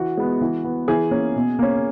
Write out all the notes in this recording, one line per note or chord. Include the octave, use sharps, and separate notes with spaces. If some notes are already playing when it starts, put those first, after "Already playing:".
Already playing: E3 F#4
G#3 B3
E3
B3
E3 G#4
A#3 C#4
B2
A#3 C#4